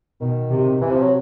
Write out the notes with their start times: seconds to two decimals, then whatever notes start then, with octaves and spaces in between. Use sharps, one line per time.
0.21 B2 D#3
0.51 C3
0.81 C3 E3
0.91 F3
1.01 F#3